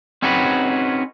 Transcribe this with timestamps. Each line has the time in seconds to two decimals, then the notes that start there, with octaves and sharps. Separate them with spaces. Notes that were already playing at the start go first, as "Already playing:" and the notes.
0.22 C4 C#4 D#4 F#4 G#4 B4